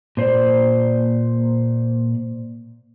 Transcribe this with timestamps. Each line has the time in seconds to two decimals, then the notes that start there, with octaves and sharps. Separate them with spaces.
0.17 A#2 C5 D5